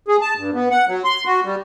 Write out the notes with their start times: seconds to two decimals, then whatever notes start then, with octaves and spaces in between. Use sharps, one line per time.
0.08 G#4
0.21 A5
0.37 G2
0.54 B3
0.70 F#5
0.88 F#3
1.04 C6
1.25 F#4
1.45 G3